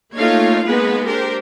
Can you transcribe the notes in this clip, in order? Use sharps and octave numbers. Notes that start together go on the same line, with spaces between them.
A3 A#3 D#4 F4 C#5 F5
G#3 A#3 B3 D#4 B4
D4 G4 A#4 C5